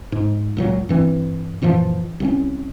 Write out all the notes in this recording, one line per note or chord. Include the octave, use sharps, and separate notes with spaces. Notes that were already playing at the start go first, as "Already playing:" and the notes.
G#2
C#2 A#2 F#3
G2 E3 C4
F#2 A#2 E3 F3
C2 E3 C#4